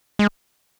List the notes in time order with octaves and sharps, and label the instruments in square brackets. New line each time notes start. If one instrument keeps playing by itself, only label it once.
[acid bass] G#3